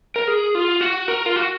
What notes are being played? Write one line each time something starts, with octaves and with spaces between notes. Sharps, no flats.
A#4
G#4
F4
F#4
A#4
F4
F#4